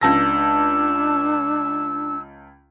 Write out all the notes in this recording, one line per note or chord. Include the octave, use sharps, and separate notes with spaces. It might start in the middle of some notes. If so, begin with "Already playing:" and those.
C#2 D4 A5 E6 A#6